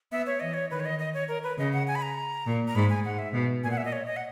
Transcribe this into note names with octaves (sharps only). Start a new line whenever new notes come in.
B3 E5
C#5
E3 D#5
C#5
D#3 B4
C#5
D#5
D#5
C#5
A#4
B4
C#3 D#5
F#5
G#5
B5
A#5
A#2
A#5
G#2 B5
G#5
G#2 F#5
E5
B2
A#2 G#5
F#5
E5
D#5
C#5
D#5
F#5